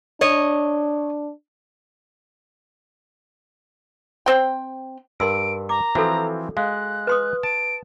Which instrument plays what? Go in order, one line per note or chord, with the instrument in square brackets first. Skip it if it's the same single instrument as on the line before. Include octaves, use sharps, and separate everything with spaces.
[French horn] D4 [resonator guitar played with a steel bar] C#5 D#5
[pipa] C4 G5
[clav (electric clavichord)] G2 [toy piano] A#4 C6 E6 [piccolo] D7
[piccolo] A#5 [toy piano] D6
[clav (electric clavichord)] E3 F3 C4 [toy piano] F#4 A4
[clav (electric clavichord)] G#3 [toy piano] F5 [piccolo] F#6
[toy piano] B4 C6 D#6
[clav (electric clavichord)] A5 [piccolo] D7